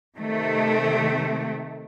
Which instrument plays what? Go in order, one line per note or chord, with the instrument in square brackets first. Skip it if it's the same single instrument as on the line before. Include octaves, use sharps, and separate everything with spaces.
[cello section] C3 D#3 A3